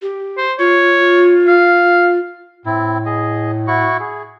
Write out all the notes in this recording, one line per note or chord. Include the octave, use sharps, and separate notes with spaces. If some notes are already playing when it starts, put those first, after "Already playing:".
G4
C5
F4 C#5
F5
A2 C4 E4
G#4 D#5
E4 F#4 C#6
G#4